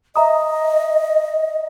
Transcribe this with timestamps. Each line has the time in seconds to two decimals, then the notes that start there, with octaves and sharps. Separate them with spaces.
0.16 D#5 E5 A#5 D#6